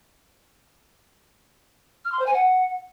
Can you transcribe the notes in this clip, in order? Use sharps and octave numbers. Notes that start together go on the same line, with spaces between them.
F6
C6
C5
G#5
F#5